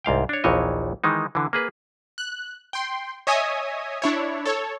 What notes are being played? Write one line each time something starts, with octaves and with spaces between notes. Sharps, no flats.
C2 G#2 F5 G5
D4 C#5
A#1 D#2 D#3 E3 C#5 D#5
D#3 E3 G#3 D#4
D3 E3
A#3 G#4 B4
F#6
G5 C6
C#5 D#5 E5 G#5 D#6
D4 E4 C#5
A4 C#5